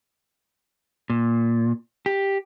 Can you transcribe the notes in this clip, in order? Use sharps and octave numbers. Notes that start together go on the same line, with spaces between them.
A#2
G4